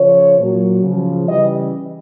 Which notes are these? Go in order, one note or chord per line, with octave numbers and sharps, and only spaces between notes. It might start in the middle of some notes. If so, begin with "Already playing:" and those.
Already playing: C#3 F3 C#5
A#2 F#3
C#3 F3
C#3 E3 G3 D#5